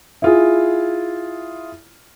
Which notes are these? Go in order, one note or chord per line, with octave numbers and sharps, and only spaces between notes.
E4 F4 G#4